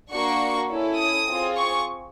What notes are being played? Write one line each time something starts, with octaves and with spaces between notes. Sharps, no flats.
A#3 D4 F#4 C#6
C#4 E4 A4
D#6
C4 F4 G#4
C#6